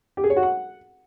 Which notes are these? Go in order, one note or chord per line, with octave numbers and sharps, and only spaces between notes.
G4
G#4
C#5
F#4
F#5